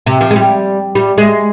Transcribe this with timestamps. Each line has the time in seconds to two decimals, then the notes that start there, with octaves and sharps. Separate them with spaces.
0.06 C3
0.21 F3
0.31 G#3
0.36 G3
0.95 G3
1.18 G#3